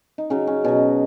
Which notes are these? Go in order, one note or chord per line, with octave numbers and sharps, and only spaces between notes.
D#4
C#3 F#3 C#4
C#4
B2 F#3 C#4